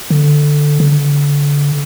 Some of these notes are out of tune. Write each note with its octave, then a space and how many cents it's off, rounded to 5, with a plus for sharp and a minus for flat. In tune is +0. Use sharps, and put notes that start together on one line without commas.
D3 +5
D3 -30